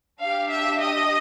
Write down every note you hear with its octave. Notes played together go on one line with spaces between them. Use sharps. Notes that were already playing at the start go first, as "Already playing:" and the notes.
D4 G4 F5
E5
D#5